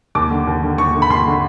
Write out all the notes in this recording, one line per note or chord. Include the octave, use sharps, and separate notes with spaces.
D#2 D6
D3
D#2
D3
D#2 C#6
D3
B5
D#2 C6
D3